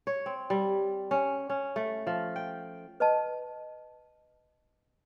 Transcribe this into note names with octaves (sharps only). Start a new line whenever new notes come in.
C#5
C4
G3
C#4
C#4
A3
F3
G5
B4 D#5 A5